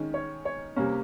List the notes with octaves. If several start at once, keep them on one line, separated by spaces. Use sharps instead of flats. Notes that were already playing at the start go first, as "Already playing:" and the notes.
Already playing: D#3 G#3 C#4
C#5
C#5
C3 G3 A#3 C#4